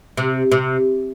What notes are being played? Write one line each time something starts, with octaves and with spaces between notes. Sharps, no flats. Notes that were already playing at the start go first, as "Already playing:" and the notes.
C3
C3